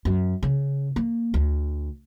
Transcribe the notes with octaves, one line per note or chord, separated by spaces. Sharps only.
F#2
C#3
A#3
D2